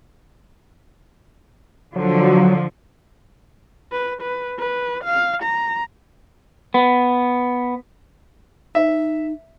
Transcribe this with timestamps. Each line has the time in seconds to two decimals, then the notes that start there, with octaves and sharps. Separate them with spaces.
1.96 D3 F3 F#3
3.92 B4
4.22 B4
4.59 B4
5.04 F5
5.43 A#5
6.74 B3
8.75 D#4 E5